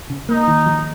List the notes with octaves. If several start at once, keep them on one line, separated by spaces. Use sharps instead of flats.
C#3
A#3 D#4
D#3
F3